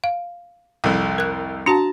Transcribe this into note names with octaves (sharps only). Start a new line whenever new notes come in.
F5
C2 F2
A#4 F#6
D4 F#4 A5 A#5